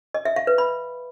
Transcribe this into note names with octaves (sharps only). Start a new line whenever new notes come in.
D#5
E5
F5
B4
B5